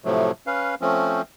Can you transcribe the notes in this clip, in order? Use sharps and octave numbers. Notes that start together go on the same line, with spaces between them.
A2 C3 F3 F#3 A3
C#4 B4 F5
F3 A3 C4 C#4